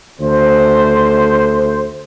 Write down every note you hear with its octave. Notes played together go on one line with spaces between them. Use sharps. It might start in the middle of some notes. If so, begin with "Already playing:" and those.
D2 A3 C5